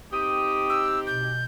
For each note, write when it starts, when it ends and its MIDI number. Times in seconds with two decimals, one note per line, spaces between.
0.11 1.34 60
0.11 1.34 63
0.11 1.34 67
0.11 0.79 87
0.69 1.00 88
1.07 1.45 47
1.07 1.44 91